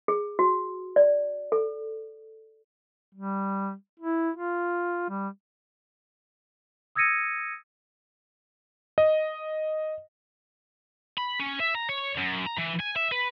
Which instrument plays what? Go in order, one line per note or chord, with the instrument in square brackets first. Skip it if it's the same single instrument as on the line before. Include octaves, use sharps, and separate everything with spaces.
[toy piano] G#4
F#4
D5
A4
[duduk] G3
E4
F4
G3
[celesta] D#6 E6 G#6 A#6 C#7 D#7
[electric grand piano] D#5
[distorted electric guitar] B5
C#4
E5
A#5
C#5
F#2
A#5
E3
G#5
E5
B4